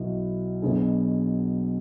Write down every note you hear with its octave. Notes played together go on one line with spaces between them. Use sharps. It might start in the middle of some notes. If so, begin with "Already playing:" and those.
Already playing: B1 B2 B3 E4
B1 B2 B3 D4 G#4